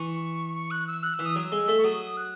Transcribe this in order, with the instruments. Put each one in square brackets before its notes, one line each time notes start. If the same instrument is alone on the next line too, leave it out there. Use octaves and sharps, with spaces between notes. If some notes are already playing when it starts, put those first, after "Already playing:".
Already playing: [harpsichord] E3 [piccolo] C#6
[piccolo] C#6
F#6
E6
F#6
E6
[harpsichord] E3
[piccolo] D#6
[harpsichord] F#3 [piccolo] E6
[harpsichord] G#3
A3
[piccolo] C#6
[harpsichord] F#3 [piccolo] D#6
[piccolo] F#6